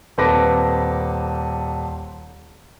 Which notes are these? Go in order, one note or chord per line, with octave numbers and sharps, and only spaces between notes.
D#1 C4 A4 B4 D6 A#6